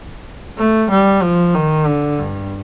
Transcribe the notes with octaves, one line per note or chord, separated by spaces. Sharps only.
A3
G3
F3
D#3
D3
G2